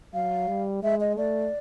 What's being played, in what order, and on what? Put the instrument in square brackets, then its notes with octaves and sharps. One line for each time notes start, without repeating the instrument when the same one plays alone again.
[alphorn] F#3 [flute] F5
[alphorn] G3
[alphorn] G#3 [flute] E5
[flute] D#5
[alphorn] A3 [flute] D5